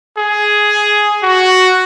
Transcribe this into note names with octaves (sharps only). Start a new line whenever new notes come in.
G#4
F#4